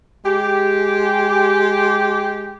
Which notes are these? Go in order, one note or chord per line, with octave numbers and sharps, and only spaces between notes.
G#3 G4